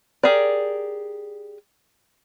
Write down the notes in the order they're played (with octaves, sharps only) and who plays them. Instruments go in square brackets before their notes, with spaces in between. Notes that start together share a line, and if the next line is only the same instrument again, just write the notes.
[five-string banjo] G4 G#4 A#4 D5